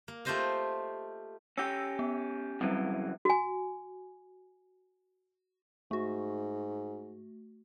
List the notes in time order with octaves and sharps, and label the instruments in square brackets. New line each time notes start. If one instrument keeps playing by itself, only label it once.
[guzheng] A#3
A3 F4 G4 C5 D#5 F5
[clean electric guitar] C#4 G4 [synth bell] E6 A#6
[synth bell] B3
[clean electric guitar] F#2 C#3 E3 [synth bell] G3 C4
[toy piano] F#4 G#5
[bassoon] G#2 [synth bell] A3 F#4